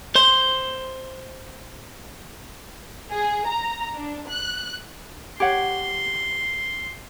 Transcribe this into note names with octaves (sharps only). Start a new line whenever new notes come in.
C5 C6
G#4
A#5
D4
F#6
G4 C#5 F#5 C6